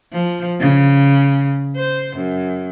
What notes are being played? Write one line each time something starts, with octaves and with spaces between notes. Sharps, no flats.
F3
C#3
C5
F#2